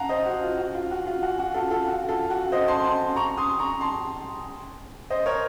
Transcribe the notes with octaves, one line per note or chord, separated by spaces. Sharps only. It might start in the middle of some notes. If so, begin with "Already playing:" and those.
Already playing: F5 F#5 A5 A#5
C5 D#5
F#4
F4
F#4
F4
F#4
F4
F#4
F#4
F4 A4
F4 A4
F#4
F4 A4
F#4
C5 D#5
A5 C6
A5 C6
A#5 C#6
C6 D#6
A#5 C#6
A5 C6
C5 D#5
A#4 C#5